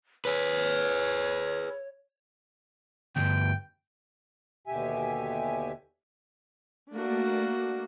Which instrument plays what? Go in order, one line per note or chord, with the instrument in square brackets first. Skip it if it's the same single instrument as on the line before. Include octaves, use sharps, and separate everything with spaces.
[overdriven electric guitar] G#4 B4 [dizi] C#5
[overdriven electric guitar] D2 G2 [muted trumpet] G5
[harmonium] D#2 B2 D3 G4 E5 G#5
[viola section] A3 A#3 D4 F#4